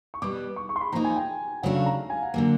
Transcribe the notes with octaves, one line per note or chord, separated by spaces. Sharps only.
C#6
B2 G3 B3 D6
C#6
C#6
C6
B5
A#2 F3 A#3 D#4 A#5
G#5
G5
C#3 F#3 A3 D4 F#4 F#5
F5
A#5
G#5
F#5
D3 F#3 A#3